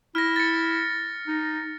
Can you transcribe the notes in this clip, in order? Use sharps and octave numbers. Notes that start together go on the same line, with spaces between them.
E4 F6 A#6
A6 C#7
D#4